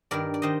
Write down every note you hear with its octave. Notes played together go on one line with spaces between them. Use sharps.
G2 D#3 A#4 D5
D5
D#3 C5 D#5